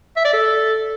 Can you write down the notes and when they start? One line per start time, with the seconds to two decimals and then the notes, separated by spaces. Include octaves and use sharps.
0.16 E5
0.25 D5
0.33 A4